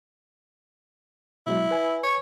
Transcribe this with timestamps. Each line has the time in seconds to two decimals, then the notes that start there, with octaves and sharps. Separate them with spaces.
1.47 B2 F#3 G#3 E4
1.71 B4 G#5
2.04 C#5